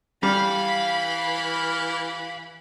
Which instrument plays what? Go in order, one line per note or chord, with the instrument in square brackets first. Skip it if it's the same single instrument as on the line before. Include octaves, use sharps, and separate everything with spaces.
[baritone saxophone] E3 [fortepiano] G3 [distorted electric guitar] F5 [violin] B5